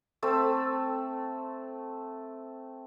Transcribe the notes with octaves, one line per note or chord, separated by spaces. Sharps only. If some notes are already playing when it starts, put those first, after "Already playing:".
A3 C4 A4 E6